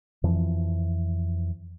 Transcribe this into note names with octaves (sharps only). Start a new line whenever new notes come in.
F2 E3 F3